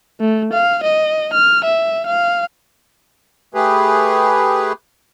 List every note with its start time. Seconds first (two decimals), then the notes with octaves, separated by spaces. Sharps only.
0.21 A3
0.53 F5
0.84 D#5
1.34 F6
1.65 E5
2.07 F5
3.54 A3 G4 G#4 B4